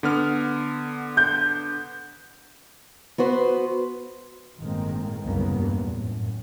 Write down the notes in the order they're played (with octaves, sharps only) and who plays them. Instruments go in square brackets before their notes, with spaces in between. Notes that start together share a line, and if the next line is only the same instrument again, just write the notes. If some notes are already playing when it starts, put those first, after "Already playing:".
[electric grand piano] D3 B3 F6
[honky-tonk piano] G6
[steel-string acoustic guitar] B3 F#4 B4 C5
[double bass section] G1 A2 D#3 G#3 A#3 C4
C2 F#2 C#3 A#3 B3
E2 G2 A#2
F#2 A2